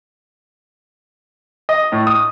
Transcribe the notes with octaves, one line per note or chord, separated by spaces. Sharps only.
D#5
A2
D#6